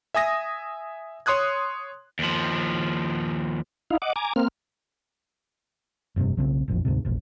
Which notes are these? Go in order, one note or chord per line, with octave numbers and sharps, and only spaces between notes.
E5 G#5 D#6 A#6
C#5 C6 D#6 F#6 G#6
D#2 F3
D#4 E4 F5
D#5 F#5 D6
G#5 A#5 D6
A#3 C4 F6
F1 G2 C3
B1 C#3 F3 C4
E1 A#1 F2
D2 G#2 C3
E1 A#1